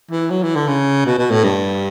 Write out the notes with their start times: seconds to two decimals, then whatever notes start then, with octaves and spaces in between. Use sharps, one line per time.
0.11 E3
0.30 F#3
0.43 E3
0.56 D3
0.68 C#3
1.06 B2
1.18 B2
1.31 A2
1.44 G2